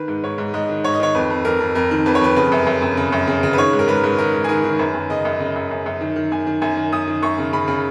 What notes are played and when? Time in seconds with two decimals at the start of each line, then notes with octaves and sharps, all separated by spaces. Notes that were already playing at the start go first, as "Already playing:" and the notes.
Already playing: D#3 B4
0.08 G#2
0.24 G#2 C#5
0.38 G#2
0.54 G#2 D#5
0.69 D#3
0.84 G#2 C#5
0.94 D#5
1.00 D#3 C#5
1.15 F2 B4
1.30 F2
1.45 F2 A#4
1.60 F2
1.75 F2 A#4
1.91 D#3
2.06 F2 B4
2.15 C#5
2.21 F2 B4
2.36 C#3 B4
2.52 F#2
2.67 F#2
2.82 F#2
2.97 C#3
3.12 F#2
3.27 C#3
3.43 C#3
3.53 B4
3.58 D#3 C#5
3.73 G#2
3.79 A#4
3.88 G#2 B4
4.04 G#2
4.19 D#3 A#4
4.34 G#2
4.44 G#4
4.49 D#3 A#4
4.64 D#3
4.79 F#2 B4
4.95 F#2
5.10 C#3 D#5
5.25 F#2
5.40 C#3
5.56 F#2
5.71 F#2
5.86 F#2
6.01 D#3
6.16 D#3
6.32 F#2 G#5
6.47 D#3
6.62 F#2 G#5
6.77 D#3
6.92 F#2 D#6
7.08 D#3
7.23 F#2 C#6
7.38 C#3
7.53 C#3 B5
7.68 C#3